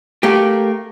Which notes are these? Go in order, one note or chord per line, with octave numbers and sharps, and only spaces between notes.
A3 A#3 G4